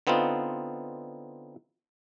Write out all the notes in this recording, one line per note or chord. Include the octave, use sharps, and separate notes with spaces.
D3 B3 C4 D#4 F4